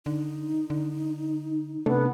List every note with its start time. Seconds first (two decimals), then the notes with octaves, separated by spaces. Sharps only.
0.06 D3 D#4
0.70 D3
1.86 C3 A3 B3 D4 A4